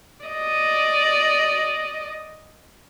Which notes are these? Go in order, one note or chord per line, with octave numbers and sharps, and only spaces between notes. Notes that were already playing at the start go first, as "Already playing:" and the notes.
D5 D#5